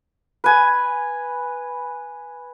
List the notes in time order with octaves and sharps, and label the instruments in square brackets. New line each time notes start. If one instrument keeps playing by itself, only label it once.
[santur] B4 G#5